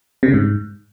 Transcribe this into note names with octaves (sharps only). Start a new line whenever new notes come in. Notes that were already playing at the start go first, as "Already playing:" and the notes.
C3
C#3
G#2